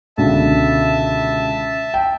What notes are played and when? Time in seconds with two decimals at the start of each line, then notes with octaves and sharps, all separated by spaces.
0.18 C#2 B2 D3 E5 A5
1.94 G5